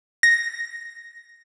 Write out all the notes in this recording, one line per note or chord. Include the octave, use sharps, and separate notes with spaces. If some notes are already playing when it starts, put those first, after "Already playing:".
A#6